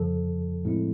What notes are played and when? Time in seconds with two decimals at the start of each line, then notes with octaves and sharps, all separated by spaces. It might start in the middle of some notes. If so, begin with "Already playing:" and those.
Already playing: F2 C#3 F3 A4
0.65 A2 F3 G#3 C4 E4